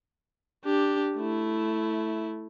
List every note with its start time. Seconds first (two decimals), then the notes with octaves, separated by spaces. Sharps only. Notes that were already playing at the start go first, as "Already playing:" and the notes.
0.65 D4 G4
1.16 A3 E4